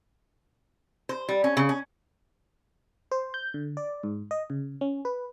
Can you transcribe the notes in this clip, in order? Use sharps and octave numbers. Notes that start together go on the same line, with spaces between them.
C5
G3
C#4
C#3
C#4
C5
G6
D3
D5
G#2
D#5
C#3
C#4
B4